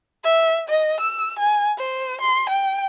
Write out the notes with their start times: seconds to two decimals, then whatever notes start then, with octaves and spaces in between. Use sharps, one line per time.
0.24 E5
0.68 D#5
1.00 E6
1.39 G#5
1.78 C5
2.21 C6
2.49 G5